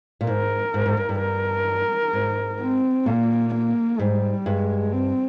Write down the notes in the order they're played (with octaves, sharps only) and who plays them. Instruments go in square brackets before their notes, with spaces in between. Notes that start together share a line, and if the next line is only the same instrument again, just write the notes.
[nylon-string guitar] A#2
[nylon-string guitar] G#2 [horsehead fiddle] A#4
[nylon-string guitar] G#2
G#2
G2
G2
[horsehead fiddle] A#4
[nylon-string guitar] G#2
[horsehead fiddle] C4
[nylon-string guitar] A#2 [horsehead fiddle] A#3
[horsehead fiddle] A#3
[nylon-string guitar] G#2 [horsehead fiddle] G3
[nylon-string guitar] G2 [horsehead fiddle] G#3
[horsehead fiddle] C4